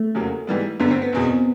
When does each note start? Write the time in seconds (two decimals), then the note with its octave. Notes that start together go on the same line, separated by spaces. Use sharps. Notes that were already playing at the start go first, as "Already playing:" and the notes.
Already playing: A3
0.15 F1 E2 C#3 F#3 A#3
0.47 G#2 E3 G3 B3
0.80 G1 F#2 D3 B3
0.91 C4
1.02 B3
1.13 F#1 E2 B2